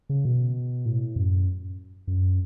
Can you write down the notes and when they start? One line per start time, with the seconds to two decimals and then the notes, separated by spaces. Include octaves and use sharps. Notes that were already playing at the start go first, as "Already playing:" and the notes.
0.09 C#3
0.25 B2
0.86 A2
1.16 F#2
2.07 F#2